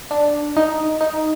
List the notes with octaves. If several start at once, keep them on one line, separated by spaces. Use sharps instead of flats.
D4
D#4
D#4